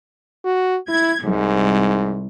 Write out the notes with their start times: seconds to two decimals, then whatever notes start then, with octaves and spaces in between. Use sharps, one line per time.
0.45 F#4
0.88 E4 G#6
1.24 C2 G#2